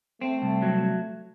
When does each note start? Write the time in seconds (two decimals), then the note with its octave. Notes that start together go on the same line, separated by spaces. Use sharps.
0.21 A3 C4
0.42 C2
0.62 F#3